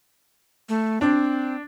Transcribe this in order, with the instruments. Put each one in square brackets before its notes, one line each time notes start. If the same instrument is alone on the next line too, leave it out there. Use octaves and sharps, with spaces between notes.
[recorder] A3
[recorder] C4 [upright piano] D4